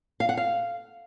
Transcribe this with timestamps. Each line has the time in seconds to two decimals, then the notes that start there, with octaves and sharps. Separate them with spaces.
0.20 F5
0.29 F#5
0.37 F5